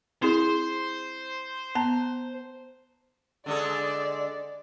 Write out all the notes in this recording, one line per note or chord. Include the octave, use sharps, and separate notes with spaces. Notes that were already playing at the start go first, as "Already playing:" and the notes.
C4 E4 G#4 C5
B3 A5 A#5
D3 G#3 A4 D5